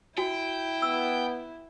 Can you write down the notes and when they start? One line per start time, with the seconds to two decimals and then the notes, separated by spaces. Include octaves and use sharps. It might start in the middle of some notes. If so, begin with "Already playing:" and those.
0.18 E4 F#4 G5 G#5
0.82 B3 E6